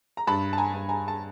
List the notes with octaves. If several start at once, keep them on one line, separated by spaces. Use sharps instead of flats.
A#5
G2 A5 B5
A5
G#5 A#5
G2
G#5 A#5
A5